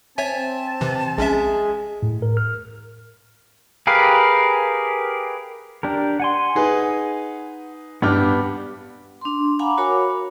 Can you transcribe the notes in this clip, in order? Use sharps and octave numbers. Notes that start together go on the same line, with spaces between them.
C4 C#5 E5 G#5 A5
C3 E3
A#1 G#3 C#4 E5
A2
A#4
F6
G4 G#4 A#4 B4 F5
D4 G4 A#4
F#5 G#5 C6
D#4 G#4 B4
G2 B3 D4 G4 B4 F6
D4 C6
F5 F#5 G#5 A#5 B5 D6
F#4 A#4 C#5 B5 D6